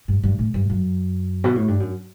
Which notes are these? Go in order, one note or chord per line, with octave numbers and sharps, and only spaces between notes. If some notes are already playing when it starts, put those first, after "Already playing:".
G2
G2
A2
G2
F#2
B2
A2
G2
F#2